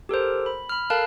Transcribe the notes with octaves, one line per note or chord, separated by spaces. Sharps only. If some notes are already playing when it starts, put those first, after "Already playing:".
G4 A4 A#4 C5
B5
B5 F6
A4 A#4 F5 A5 F6 F#6